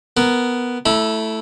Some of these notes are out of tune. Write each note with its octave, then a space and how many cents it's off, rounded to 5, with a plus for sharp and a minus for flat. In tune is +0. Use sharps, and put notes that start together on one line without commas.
B3 +0 A#4 +0
A3 +0 E4 +0 B5 -40